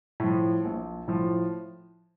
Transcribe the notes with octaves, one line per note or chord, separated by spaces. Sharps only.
A2 F3
A#1
A2 F3